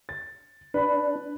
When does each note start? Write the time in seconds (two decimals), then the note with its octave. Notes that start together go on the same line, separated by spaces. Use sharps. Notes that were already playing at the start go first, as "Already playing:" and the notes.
0.09 A6
0.74 D4 B4 B5